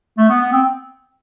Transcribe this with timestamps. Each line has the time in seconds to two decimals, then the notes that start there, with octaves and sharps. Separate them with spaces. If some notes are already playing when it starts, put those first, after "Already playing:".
0.17 A3
0.29 B3
0.41 B3
0.52 C4